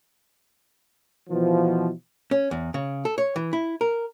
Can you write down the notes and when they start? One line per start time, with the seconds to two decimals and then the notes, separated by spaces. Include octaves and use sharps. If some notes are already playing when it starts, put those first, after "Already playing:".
1.30 B2 E3 F3
2.31 C#4
2.51 E2
2.74 C#3
3.05 A4
3.18 C#5
3.36 E3
3.53 E4
3.81 A#4